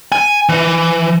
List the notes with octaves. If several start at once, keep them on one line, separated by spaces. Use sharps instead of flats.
G#5
E3